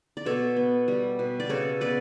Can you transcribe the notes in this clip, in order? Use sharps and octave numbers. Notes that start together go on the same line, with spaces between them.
D5
B2 A4 C#5
B3
G3
B2
D5
C#3 A4 C#5
B3 B4 D5